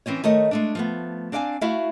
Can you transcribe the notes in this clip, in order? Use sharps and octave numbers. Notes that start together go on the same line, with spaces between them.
E3 C4 C#4 C#5
D#3 A3 C#5 D#5
G#3 A3 D4
F3 A3 B3
C4 D4 D5 F5 G5 G#5
A3 E4 F#4 E5 F5